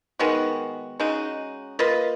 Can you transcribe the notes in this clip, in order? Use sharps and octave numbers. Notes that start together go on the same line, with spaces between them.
D#3 G#3 B3 F#4
C#3 G#3 D#4 F#4
A#3 F4 B4 D#5